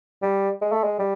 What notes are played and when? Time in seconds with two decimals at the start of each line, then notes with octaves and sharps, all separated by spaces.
0.22 G3
0.61 G#3
0.72 A3
0.84 G#3
0.99 G3